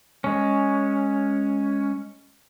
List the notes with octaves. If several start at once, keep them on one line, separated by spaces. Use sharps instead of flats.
G#3 C#4